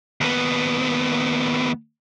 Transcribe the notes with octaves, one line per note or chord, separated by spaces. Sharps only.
D#2 B3